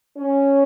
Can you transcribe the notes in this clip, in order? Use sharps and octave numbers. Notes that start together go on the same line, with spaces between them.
C#4